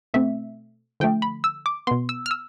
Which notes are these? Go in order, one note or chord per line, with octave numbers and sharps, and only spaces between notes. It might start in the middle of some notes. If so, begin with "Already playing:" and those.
B2 A3 C4 E5
D3 F3 A3 G5
B5
E6
D6
B2 B3 C6
E6
F6
E6